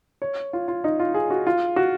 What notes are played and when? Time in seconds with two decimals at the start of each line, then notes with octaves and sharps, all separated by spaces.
0.22 C#5
0.53 F4
0.68 F4
0.84 D#4
1.00 F4
1.14 G#4
1.30 F#4
1.47 F4
1.76 F#4